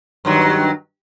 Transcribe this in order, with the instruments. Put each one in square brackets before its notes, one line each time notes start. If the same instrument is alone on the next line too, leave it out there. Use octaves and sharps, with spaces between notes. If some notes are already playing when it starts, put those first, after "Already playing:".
[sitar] G2 D#3 F#3